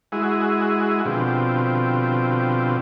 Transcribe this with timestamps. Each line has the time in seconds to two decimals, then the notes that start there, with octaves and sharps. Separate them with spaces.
0.12 G#3 E4 F#4 G#4
1.05 B2 D3 F3 C4 G4